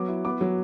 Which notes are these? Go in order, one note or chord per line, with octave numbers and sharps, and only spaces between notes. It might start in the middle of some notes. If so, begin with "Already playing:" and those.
Already playing: F#3 B3 D6
E4
B3 D6
F#3